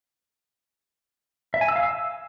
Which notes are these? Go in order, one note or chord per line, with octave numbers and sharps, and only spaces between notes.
E5
G#5
E6
F5
E6